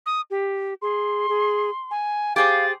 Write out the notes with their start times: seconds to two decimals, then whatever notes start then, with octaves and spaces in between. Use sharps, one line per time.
0.06 D#6
0.31 G4
0.82 G#4 C6
1.29 G#4
1.91 G#5
2.36 G4 G#4 C5 F5 A6